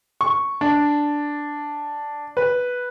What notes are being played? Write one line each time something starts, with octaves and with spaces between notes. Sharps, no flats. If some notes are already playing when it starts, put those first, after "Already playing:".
C#6
D4
B4